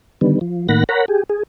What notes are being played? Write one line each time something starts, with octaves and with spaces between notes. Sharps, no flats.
D3 D#3 G3 B3
F3
A2 D#3 A#3 F#5 B5 A#6
A#4 C#5 F#5 A#5 B5
G4 G#4
G#4